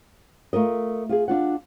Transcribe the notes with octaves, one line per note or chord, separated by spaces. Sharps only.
A3 F4 A#4 D#5
F4 G4 G#4
D4 F4 F#5